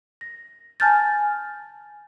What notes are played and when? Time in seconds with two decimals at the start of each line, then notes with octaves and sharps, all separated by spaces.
0.21 A#6
0.80 G#5 A5 F6 G6 A6